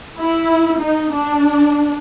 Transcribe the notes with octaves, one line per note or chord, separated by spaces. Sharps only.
E4
D#4
D4